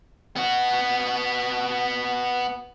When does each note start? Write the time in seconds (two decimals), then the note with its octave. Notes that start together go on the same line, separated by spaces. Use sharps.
0.36 B3 F#4